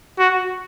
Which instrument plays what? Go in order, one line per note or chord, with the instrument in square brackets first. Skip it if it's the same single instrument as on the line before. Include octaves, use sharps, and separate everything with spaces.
[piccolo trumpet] F#4